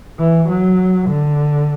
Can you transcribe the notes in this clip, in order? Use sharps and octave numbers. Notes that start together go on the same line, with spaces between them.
E3
F#3
D3